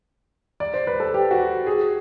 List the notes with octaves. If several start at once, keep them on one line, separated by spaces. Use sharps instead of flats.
D5
C5
B4
A4
G4
F#4
G#4